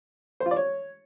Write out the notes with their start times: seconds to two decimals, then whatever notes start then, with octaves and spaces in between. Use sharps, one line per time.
0.40 C5
0.46 F4
0.51 D5
0.56 C#5